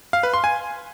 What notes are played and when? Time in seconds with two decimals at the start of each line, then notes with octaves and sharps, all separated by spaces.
0.13 F5
0.23 B4
0.34 C6
0.44 G#5